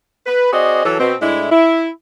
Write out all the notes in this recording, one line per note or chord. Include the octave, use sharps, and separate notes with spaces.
B4
C4 F#4 G#4 D5 D#5
E3 F#3 A4
B2 C4
A2 G#3 D4 E4
E4